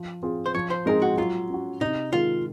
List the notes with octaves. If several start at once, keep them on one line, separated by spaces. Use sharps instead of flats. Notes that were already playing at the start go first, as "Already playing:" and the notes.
Already playing: F3
C4 F4 G#4
C5
F3 C#5
C5
G#3 C4 D#4 G#4 A#4
F#4
F#3 F4
C#4 F#4
C3 D#4
D#3 G#3 F4